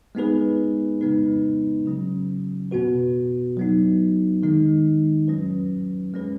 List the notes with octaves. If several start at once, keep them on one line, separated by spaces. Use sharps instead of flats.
G#3 B3 D#4 G#4 B4
C#3 G#3 B3 D#4 B4
C#3 F#3 C#4
B2 B3 F#4 B4
F#3 B3 D#4
D#3 G#3 D#4
F#3 C#4 B4
G#3 C#4 B4